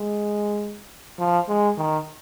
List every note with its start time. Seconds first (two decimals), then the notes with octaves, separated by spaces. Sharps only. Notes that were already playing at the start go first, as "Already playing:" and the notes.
Already playing: G#3
1.18 F3
1.48 G#3
1.77 D#3